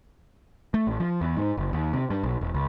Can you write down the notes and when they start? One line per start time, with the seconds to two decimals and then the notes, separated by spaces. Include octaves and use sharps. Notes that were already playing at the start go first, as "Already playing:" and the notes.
0.74 A3
0.87 A1
1.00 F3
1.21 E2
1.37 G#2
1.57 F#1
1.73 D#2
1.93 C3
2.10 G2
2.23 B1
2.41 E1
2.54 C#2